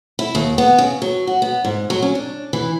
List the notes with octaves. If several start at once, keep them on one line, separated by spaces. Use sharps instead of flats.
E4
D#2
B3
C#3
F#3
F#4
B3
G#2
F#3
C#4
D4
E3